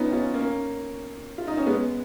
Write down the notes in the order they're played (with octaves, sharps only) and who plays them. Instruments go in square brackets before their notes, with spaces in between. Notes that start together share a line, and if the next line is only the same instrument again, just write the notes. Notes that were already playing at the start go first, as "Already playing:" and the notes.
Already playing: [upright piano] B3 C#4 D#4 F4
C#4 F4
A#3 C#4
F4
D#4
C#4
G#3 B3